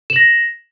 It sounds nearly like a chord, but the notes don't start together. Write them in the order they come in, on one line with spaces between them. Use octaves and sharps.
E7 F#7 A#6